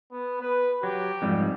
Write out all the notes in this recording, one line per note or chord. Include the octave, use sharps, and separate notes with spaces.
B3
B4
F#3 G4
F2 G#2 G3